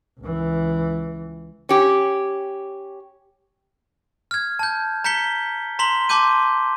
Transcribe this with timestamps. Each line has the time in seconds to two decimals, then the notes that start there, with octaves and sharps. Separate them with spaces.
0.19 C#2 E3
1.69 C#4 G4
4.31 F6 G#6
4.59 A5 G6
5.04 A#5 G6 B6 C#7 G7
5.79 A#5 C6 B6 F#7 G7
6.09 A5 C6 D6 G6 D#7